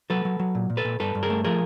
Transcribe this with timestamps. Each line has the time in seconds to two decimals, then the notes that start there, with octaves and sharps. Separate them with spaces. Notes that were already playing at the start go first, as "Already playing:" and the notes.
0.10 F#3 A4 B4
0.25 F#3
0.40 F#3
0.55 A#2
0.70 A#2
0.77 A4 B4
0.85 A#2
1.00 G2 A4 B4
1.15 G2
1.23 G#4 A#4
1.30 A3
1.45 F3 G#4 A#4